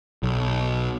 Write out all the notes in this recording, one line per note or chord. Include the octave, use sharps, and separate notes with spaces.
B1